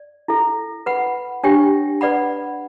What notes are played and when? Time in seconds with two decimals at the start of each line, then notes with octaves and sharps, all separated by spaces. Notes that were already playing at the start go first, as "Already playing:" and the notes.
Already playing: D5
0.28 E4 A4 E5
0.86 B4 F#5 B5
1.44 D4 G4 C#5 E5 G5
2.01 B4 D5 F#5 B5